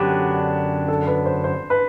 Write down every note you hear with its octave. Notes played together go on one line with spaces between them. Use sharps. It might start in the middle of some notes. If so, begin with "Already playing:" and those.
Already playing: F#2 D3 F#3 B3 D4 G4
A4
B4
C5
C5
B4